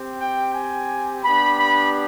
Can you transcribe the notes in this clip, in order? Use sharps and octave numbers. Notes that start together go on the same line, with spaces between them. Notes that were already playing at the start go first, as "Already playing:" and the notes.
Already playing: C4 G4
G5
G#5
B3 D4 G4 B5
B5